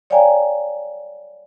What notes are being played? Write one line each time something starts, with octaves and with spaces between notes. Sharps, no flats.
C#5 D5 F5 G5 G#5 A#5